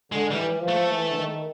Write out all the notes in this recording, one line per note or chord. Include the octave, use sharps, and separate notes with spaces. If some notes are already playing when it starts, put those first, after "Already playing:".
D3 G#3
E3 G3
E3
F3
A3
E3
D3
D#3